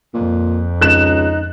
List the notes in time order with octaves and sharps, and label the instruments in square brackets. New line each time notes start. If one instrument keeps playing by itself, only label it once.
[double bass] F2 [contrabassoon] A#2
[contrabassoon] C#2 [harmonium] D#4 [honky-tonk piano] F#6 E7